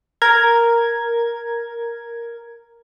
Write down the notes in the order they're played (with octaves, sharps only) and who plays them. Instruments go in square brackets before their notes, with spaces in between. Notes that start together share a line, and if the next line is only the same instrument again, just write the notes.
[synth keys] A#4 G#6